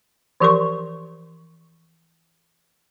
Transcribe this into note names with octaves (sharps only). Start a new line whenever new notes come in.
E3 F3 G4 A#4 C6 C#6